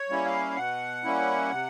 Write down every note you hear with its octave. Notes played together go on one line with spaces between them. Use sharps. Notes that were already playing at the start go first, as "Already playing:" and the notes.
Already playing: C#5
G3 A#3 C#4 E4
F5
B2 F#5
G3 A#3 C#4 E4
C3